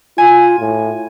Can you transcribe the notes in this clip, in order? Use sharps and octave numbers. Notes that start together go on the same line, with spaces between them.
F4 G#5
A2